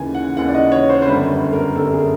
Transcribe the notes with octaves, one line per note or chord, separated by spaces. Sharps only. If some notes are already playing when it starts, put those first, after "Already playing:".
Already playing: D#2 C#3 E3 G#5
F#5
D#2 C#3 E3 F#5
D5
D#5
C#5
C5
C5
G1 F#2 D3 G3 B4
A#4
G1 F#2 D3 G3 A4
G#4